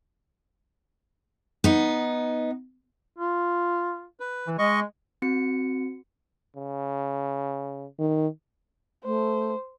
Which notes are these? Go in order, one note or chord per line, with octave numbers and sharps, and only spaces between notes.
B3 D#4
F4
B4
E3
G#3 D#5 C#6
C4 F#4 C#7
C#3
D#3
A3 C5